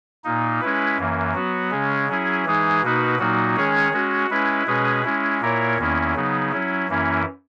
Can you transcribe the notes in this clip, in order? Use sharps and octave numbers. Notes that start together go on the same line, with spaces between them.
A#2 A#3 D#4
G#3 C#4 E4 B4
F#2 E3 A#3
F#3 B3 F#4
C#3 G#3 C#4
F#3 C#4 E4 G#4
E3 G#3 D#4 G#4
B2 A#3 D#4 F#4 B4
A#2 F#3 A#3 D#4 F#4
D#3 G#3 C#4 G#4 C#5
G#3 C#4 F#4
G#3 C#4 E4 B4
B2 G#3 C#4 G#4 B4
G#3 C#4 E4
A#2 A#3 E4 A#4 C#5
E2 D#3 A#3 C#4 E4
C#3 F#3 B3 D#4
F#3 C#4 E4
F#2 E3 A#3 C#4 E4